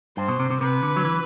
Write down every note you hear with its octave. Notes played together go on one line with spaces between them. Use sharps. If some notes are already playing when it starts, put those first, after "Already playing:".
G2 C5
B2
C3
C3
C3 B4
D3
F#3
E3